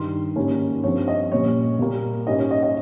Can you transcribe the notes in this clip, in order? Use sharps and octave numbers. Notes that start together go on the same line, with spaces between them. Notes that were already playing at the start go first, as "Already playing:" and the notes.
Already playing: G2 D#3 G3 C6
G#2 D#3 G3 A#3 C#4
G2 F3 C4 C#5
D#5
A#2 G3 A#3 C#4 C#5
A#2 G3 A#3
G#2 G3 C#4 D#5
C#5
D#5
D#5